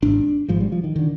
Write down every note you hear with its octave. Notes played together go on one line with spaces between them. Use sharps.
G#1 G#2 D4
G#1 G#2 F3
G3
F3
D#3
D3 D#3